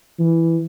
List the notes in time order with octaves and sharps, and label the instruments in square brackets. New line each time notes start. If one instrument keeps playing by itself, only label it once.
[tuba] E3